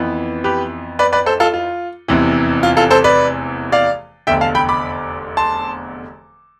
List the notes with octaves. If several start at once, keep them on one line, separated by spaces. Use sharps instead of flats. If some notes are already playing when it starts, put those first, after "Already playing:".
Already playing: F2 E3 B3
G4 B4
B4 D5
B4 D5
A4 C5
F4 A4
F4
F1 E2 C3 E3
F4
F4 A4
A4 C5
B4 D5
D5 F5
F1 E2 D3 E5 G5
F5 A5
G5 B5
B5 D6
A5 C6